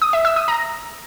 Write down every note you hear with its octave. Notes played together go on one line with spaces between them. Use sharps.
D#6
E5
E6
D#6
A#5